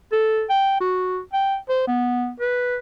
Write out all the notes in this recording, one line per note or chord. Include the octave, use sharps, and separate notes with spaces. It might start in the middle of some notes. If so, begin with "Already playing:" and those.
A4
G5
F#4
G5
C5
B3
B4